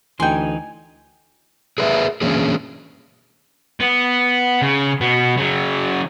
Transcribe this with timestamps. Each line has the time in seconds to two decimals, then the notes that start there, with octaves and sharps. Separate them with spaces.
0.20 D2 E3 D#4 G5 G#5 C6
1.78 G#4 A#4 B4 E5
2.21 E3 A#3 C#4 D4 G#4
3.80 B3
4.62 C#3
5.01 B2 B3
5.37 C#3 F#3